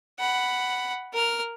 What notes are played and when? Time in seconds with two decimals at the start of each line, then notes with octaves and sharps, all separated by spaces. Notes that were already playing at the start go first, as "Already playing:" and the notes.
0.19 F#5 B5
1.14 A#4 F6